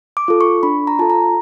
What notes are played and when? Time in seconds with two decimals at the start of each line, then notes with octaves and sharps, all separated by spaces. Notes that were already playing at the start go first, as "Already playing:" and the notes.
0.17 D6
0.28 F4 A4
0.41 C#6
0.63 D4 B5
0.87 A#5
0.99 F4 A4 A5
1.10 A#5